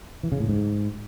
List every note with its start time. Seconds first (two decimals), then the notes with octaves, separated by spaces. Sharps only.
0.23 E3
0.32 C#3
0.40 A2
0.49 G#2